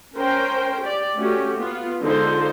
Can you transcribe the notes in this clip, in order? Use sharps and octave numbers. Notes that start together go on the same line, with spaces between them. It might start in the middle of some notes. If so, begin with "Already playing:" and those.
C#4 A#4 C5 G5
G4 D5
A3 C#4 F#4 G4
B3 F4
D3 G#3 D#4 F4 A4 C5